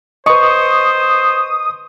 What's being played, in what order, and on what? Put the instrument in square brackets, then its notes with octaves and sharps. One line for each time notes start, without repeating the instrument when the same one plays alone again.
[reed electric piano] B4 D#5 [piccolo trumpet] C5 [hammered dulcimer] C#6 [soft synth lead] D#6